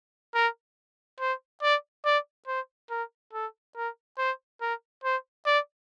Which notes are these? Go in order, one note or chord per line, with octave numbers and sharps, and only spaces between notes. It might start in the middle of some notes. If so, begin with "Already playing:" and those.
A#4
C5
D5
D5
C5
A#4
A4
A#4
C5
A#4
C5
D5